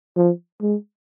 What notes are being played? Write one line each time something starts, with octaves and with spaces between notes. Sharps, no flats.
F3
G#3